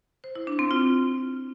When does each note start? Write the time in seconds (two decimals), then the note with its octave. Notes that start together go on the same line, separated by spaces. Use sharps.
0.24 C5
0.35 E4
0.47 D4
0.59 C4
0.71 F4